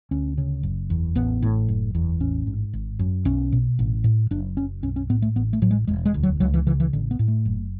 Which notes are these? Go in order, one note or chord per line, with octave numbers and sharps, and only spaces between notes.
D2 C#4
C#3
F#1
E2
A1 B3
A2
F#1
E2
A1 C#4
G#2
G#1
F#2
B1 C#4
B2
A1
A2
F#1 D4
F#2 C#4
B1 C#4
C#4
A2 B3
A3
A1 B3
A3
A2 F#3
G#3
E1 G#3
G#3
D2
F#3
C#2 F#3
E3
C#3 E3
E3
A1 D3
B3
A2
A3
F#1